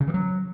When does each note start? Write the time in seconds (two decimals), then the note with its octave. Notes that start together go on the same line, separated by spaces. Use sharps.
0.01 C#3
0.07 E3
0.14 F#3